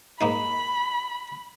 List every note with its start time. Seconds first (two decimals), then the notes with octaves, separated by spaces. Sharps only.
0.21 G#2 A#3 D#4 B5